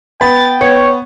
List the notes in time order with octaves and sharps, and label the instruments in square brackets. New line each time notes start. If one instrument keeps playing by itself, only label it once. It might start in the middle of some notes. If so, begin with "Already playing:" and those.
[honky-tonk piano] B3 [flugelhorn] G5 [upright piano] B5 [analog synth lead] A6
[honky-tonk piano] B3 [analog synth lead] C#5